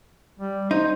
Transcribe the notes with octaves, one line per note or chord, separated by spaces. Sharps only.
G3
D#4 C5